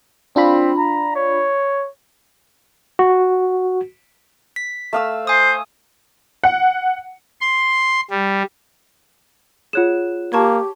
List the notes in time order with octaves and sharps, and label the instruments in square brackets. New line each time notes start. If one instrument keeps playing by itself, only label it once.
[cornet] C4 [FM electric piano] D4 F4 B5
[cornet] A#5
C#5
[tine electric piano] F#4
[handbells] B6
[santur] A3 F5 E6
[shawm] C5 [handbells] G#5 D#6
[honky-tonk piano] F#5
[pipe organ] C6
G3
[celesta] F4 F#6 E7 [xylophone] G#4 C#5 F#5
[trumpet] A#3 [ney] G4 [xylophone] A5 C#6 G#6